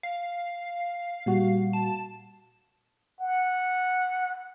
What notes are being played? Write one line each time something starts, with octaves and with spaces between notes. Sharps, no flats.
F5
A#2 G3 F#4
A5
F#5